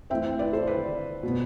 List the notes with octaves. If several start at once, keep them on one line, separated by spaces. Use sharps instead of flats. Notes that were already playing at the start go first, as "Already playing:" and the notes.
E3 A3 C4 E5 G5
B4 D5
A4 C5
B4 D5
B2 B3